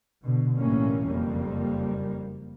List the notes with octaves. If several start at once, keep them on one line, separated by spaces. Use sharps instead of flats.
B2 D3
B1 A2 E3 G3 A#3 C#4
F#1 F2 G3 A#3